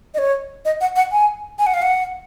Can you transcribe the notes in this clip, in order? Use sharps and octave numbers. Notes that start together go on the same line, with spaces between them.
D#5
C#5
D#5
F#5
F#5
G#5
G#5
F#5
F5
F#5